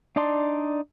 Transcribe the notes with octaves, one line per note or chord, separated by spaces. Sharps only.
D4 D#4 D5 A5 C6